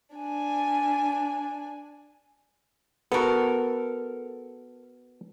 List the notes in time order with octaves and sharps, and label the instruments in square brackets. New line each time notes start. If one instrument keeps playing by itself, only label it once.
[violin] D4 G#5
[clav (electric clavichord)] B3 F#4 [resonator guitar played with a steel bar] A4 A#4